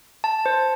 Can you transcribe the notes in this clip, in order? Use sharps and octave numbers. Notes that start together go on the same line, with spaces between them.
A5
C5